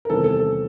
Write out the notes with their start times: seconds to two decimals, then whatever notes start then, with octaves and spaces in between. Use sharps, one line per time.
0.05 A#4
0.09 E2 C3 D#3 G3 A4
0.24 A4
0.40 A4